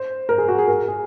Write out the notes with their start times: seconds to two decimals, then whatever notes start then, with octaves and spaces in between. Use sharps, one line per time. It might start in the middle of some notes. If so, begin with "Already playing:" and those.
Already playing: C5
0.29 A#4
0.38 G#4
0.48 F#4
0.58 G#4
0.68 A#4
0.88 G#4